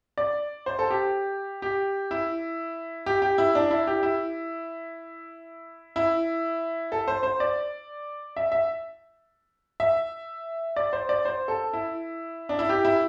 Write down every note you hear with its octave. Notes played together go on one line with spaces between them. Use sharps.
D5
C5
A4
G4
G4
E4
G4
G4
E4
D4
E4
G4
E4
E4
A4
C5
C5
D5
E5
E5
E5
D5
C5
D5
C5
A4
E4
D4
E4
G4
E4